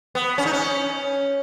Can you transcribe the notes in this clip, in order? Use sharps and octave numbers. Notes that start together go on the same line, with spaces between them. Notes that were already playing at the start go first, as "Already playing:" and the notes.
B3
C#4
D#4
C#4